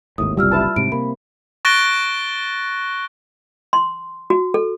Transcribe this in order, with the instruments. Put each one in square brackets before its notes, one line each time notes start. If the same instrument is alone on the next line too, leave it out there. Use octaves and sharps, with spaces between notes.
[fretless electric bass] G#1 D#2 A2 [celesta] D#6
[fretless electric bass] F#1 C2 [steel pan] G3 [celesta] F4 E6 F6
[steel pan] E4 B4 A5
[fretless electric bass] G#2 C3 [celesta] D7
[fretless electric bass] C3 A#3 [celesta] B5
[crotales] C#6 F#6 A6 A#6 D7 G7
[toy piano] C6
F#4
A4